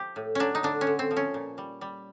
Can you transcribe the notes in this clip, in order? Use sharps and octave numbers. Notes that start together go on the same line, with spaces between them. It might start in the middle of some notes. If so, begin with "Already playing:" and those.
Already playing: F3 G4
A2
F#3 C#4 D4
D#4
D3 D4
C#4
D3
C4
F3
C#4
A#2
G3
G3